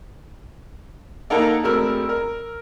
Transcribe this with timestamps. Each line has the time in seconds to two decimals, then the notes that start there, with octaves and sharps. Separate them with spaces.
1.30 A#3 D#4 A4 A#4 F#5 A#5
1.63 E1 A3 C4 A#4 E6
2.09 A#4